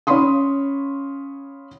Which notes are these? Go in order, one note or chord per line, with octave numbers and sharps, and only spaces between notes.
C#4 C#5 F5 B5 C6 D#6